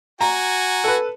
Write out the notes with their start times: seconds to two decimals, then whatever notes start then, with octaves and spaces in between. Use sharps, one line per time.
0.21 F#4 G#5 A#5
0.84 A4 B4